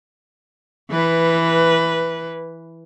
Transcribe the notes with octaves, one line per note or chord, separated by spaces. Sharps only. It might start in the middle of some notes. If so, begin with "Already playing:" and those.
E3 B4